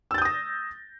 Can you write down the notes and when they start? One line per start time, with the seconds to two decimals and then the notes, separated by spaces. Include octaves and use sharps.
0.11 E6
0.14 A6
0.18 G6
0.22 D#6
0.25 A#6